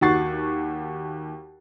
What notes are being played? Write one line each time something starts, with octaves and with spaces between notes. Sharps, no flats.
D#2 F#4 F#5 C#6 A6 C7